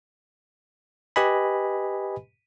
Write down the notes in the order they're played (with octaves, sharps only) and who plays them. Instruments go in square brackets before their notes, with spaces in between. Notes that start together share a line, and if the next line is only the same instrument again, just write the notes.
[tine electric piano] G4 B4 D#5 G#5 B5